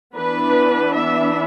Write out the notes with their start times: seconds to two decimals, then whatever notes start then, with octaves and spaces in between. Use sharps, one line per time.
0.16 E3 B3 D4 B4
0.95 E5